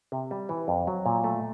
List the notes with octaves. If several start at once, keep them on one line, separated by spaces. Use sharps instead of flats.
C3
G3
E3
F2
F#3
A#2
A3